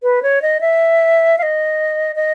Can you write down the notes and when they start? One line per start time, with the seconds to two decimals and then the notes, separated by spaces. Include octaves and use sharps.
0.03 B4
0.23 C#5
0.42 D#5
0.61 E5
1.38 F5
1.43 D#5
2.16 D#5